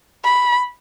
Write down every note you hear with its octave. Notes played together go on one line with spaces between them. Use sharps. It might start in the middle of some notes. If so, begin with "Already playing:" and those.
B5